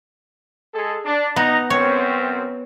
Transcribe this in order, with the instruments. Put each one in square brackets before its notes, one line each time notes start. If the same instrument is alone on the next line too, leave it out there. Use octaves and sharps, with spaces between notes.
[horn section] G#3 G#4 A4
D4
[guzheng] B3 [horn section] D#4 A#5
[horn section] F#2 C4 [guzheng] C#5